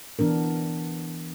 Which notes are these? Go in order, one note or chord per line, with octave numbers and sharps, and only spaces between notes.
E3 B3 D4 A#4